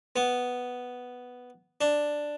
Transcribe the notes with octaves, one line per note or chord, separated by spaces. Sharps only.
B3
D4